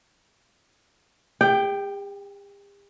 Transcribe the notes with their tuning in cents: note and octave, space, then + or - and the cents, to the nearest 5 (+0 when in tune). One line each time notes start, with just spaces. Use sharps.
G4 +45 G5 +0